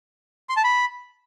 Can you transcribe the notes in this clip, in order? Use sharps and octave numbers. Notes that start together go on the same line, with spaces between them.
C6
A5
B5